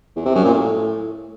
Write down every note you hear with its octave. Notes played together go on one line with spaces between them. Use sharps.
E2
C3
F#2
A#2
A2